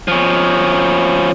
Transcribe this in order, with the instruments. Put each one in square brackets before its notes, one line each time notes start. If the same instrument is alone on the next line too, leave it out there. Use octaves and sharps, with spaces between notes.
[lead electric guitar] F3 C#4